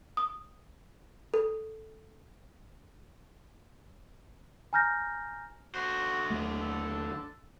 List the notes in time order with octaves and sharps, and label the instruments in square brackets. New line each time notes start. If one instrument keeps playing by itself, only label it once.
[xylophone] D#6
A4
[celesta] G#5 A#5 F6 G6 A#6
[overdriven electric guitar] D3 C5 [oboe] F#4
[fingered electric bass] D#2 F#3 A3
[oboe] A4